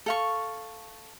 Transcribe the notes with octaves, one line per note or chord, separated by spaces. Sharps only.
A4 F5 C#6